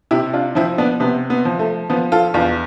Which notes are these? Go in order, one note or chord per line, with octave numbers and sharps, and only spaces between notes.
C3 E4 G4
D4 F4
F3 C4 E4
B3 D4
C3 B3
B3
F3
A3
F3 B3
F4 A4
E2 D4 F4